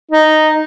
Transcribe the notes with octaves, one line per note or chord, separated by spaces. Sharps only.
D#4